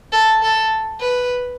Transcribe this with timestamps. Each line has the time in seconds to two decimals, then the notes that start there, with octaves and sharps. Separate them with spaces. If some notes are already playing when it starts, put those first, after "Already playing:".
0.12 A4
0.42 A4
1.01 B4